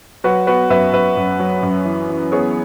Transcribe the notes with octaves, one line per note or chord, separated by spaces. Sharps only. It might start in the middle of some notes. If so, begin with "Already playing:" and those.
F#3 F#4 B4
B3 F#4 B4
F#2 B4 E5
F#2 B4 E5
F#2
F#3
F#2
E3
E3
B3 G#4 C#5